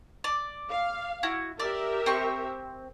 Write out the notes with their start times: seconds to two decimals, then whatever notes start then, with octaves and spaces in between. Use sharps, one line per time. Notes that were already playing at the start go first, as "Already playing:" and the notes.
0.24 D5
0.70 F5
1.23 E4 F#4
1.60 G4 A#4 D5 E5
2.06 C4 C#6